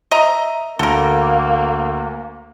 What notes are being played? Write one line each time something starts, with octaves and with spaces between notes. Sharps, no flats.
D#5 E5 A#5
D2 A#3 A4 A#4